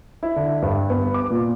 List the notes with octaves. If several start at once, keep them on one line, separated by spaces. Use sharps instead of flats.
E4
D3
G2
B3
D6
A#2